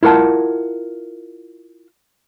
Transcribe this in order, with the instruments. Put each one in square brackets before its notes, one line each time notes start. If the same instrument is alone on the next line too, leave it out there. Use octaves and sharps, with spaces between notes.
[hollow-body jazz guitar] E4 F4 A#4 F#5 A5